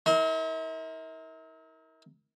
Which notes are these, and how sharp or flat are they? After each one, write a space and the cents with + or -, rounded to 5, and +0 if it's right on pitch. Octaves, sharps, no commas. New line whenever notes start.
E4 -45 A#4 +0 C6 +0